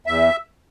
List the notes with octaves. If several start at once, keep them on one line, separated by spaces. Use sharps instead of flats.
E2 E5